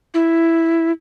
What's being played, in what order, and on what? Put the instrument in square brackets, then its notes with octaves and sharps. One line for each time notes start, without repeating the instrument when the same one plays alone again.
[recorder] E4